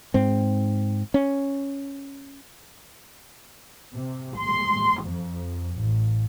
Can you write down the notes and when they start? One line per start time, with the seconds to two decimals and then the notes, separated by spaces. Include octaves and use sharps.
0.14 G#2 C4
1.14 C#4
3.95 C3
4.36 C6
5.04 F2
5.77 A1